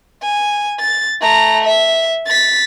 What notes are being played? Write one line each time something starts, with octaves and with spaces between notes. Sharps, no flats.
G#5
A6
A3 A#5
E5
A6 B6